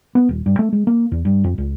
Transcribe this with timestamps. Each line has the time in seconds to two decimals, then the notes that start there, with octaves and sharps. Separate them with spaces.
0.15 B3
0.29 D#1
0.46 G2
0.59 A3
0.73 G#3
0.87 A#3
1.12 E2
1.25 G2
1.44 F2
1.58 C#2